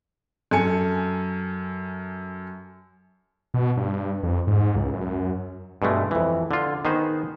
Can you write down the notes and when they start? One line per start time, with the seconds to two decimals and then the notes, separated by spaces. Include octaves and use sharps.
0.51 F#2 A4 G#5 C#7
3.54 B2
3.77 G2
4.23 F2
4.47 G#2
4.76 C#2
4.93 F#2
5.82 G2 B2 G#3 A3
6.11 F2 E3
6.51 D3 F4
6.85 D#3 B3 D#4 G#4 C5